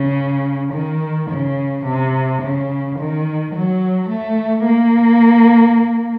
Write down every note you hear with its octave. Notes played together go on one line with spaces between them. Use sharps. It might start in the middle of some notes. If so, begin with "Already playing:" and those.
Already playing: C#3
D#3
C#3
C3
C#3
D#3
F#3
A3
A#3